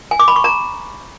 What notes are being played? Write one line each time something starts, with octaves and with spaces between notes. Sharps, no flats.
G#5
D6
B5
C#6
A#5